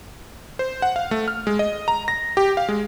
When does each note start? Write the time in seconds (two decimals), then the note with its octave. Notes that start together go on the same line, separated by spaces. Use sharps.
0.59 C5
0.82 F#5
0.96 F5
1.11 A3
1.28 F6
1.47 G#3
1.59 D#5
1.88 A#5
2.08 A#6
2.37 G4
2.57 F5
2.69 G#3